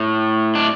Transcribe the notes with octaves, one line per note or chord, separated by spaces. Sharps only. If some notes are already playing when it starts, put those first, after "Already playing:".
Already playing: A2
D4